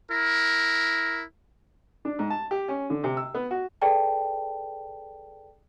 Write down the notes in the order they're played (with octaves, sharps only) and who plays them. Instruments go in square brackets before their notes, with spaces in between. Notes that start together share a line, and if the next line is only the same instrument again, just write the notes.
[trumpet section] E4 A#4
[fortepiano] D4
G#2
A5
G4
C#4
D3
C3
E6
B3
F#4
[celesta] G#4 A4 B4 D5 G5 A5